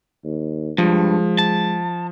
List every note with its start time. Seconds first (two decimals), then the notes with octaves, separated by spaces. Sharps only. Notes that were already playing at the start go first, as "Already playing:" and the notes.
0.24 D#2
0.78 G2 F3 G#3
1.38 A5